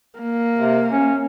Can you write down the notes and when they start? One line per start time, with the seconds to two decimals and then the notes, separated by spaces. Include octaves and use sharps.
0.20 A#3
0.58 C3
0.91 C#4